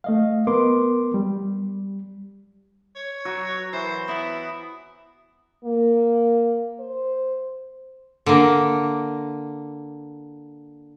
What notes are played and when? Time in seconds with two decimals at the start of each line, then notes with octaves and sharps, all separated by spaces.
0.04 A3 D#5 F5
0.47 B3 A#4 C6 D6
1.14 G3
2.95 C#5
3.25 F#3 F#4
3.73 E3 C5
4.08 B3 E4
5.64 A#3
6.80 C5
8.26 D3 A#3